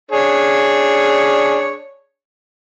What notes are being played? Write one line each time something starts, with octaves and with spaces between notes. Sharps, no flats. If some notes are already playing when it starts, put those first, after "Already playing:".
D4 G#4 C#5